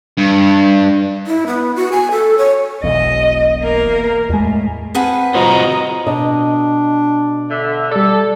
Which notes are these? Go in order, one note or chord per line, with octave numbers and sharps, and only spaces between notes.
G2
E4
B3
F#4
G#5
A4
C#5
E1 B1 E2 D#5
A#3 A#4
E2 A2 G#3
C4 G#4 B4 F#5 A5
F4 F#4 C5 D#5 A#5
B2 D4 D#5
D3 E5
G3 A4 D5